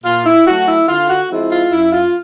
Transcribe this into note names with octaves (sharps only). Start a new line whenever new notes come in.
A#2 F4
E4
F#3 A3 F#4
E4
D3 F4
F#4
F3 G#3 C4 E4
F4
F#2 E4
F4